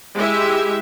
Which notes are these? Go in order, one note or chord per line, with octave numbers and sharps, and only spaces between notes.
G#3 E4 G4 E5